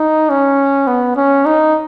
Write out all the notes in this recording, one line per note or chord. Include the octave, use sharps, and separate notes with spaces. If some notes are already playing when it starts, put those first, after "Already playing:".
Already playing: D#4
C#4
B3
C#4
D#4